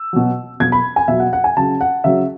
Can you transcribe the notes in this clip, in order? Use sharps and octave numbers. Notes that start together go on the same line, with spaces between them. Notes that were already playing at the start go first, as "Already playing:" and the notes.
Already playing: E6
B2 F#3
B2 F#3 G#6
B5
G#5
B2 F#3 E5
F#5
F#5
G#5
C#3 F#3 A5
F#5
C#3 F#3 E5